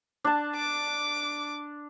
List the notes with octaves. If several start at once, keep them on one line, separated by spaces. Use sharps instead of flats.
D4 A5
D6